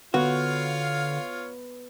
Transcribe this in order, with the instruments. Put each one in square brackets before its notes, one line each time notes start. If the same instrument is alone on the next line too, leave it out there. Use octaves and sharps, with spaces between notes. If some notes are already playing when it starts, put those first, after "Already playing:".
[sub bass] D3 [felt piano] B3 [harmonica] F4 C#5 F5 [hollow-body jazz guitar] F#4